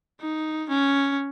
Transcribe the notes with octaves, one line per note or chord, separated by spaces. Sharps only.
D#4
C#4